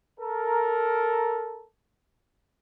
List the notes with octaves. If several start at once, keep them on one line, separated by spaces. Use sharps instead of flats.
A4 A#4